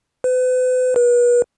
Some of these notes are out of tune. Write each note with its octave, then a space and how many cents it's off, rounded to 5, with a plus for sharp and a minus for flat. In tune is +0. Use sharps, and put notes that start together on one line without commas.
B4 +40
B4 -35